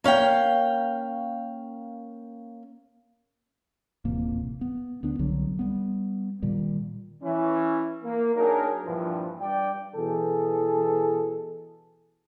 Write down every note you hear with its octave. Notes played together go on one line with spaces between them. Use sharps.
A#3 C#4 F5 G5
D#1 A1 C3 A#3
B3
D2 B3 D4
C2 D3 F#3 G3
G3 B3
A#2 D#3 G3
E3 C#4
A#3
F#3 D4 D#4 G#4 A#4
G2 A#2 E3 F3
G2 D5 G5
B2 E3 G#4 A4